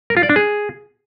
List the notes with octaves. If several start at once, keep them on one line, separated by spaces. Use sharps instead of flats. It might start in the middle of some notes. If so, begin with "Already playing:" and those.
A#4
F4
D5
D4
G#4